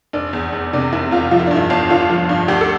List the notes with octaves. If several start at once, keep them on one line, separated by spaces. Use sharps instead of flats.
F1 D4
E2
F1
C3 D4
F1 E4
E2 F4
F3 F4
E4
D4
G2 E4
G1
D3 F4
F3
G2
D2 G4
A4